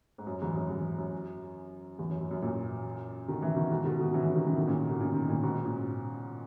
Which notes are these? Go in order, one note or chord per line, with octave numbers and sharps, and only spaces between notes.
G#2
F#2
E2 G#2
F#2
E2
F#2
E2
F#2
F#2
F#2
F#2 A#2
B2 D#3
C#3 E3
B2 D#3
G#2 B2
B2 D#3
B2 D#3
C#3 E3
C#3 E3
B2 D#3
C#3 E3
B2 D#3
A#2 C#3
B2 D#3
A#2 C#3
B2 D#3
A#2 C#3
G#2 B2
A#2 C#3